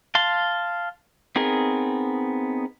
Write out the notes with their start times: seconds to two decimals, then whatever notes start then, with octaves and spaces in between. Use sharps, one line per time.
0.15 F5 A5 C6
1.36 B3 C4 D#4 G#4 A#4